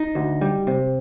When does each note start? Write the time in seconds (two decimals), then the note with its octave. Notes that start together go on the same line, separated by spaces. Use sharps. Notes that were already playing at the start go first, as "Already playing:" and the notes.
Already playing: D#4
0.15 D2
0.41 G3
0.67 C3